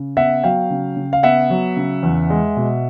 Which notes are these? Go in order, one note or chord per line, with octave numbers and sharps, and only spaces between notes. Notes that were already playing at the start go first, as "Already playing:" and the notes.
Already playing: C#3
B3 E5 F#5
F#3 F5 G5
C#3
C#3
F5
B3 E5 F#5
F#3
C#3
E2
G#3
B2